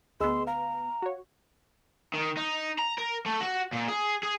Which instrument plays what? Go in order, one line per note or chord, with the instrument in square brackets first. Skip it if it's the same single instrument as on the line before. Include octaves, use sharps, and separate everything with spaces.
[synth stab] D2 B3 [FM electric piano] G#4 D#5 E6 [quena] C6
[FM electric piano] F5 [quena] A#5
[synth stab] F#4 C#5
[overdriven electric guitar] D#3
D#4
A#5
A#4
A3
F#4
A#2
G#4
G#4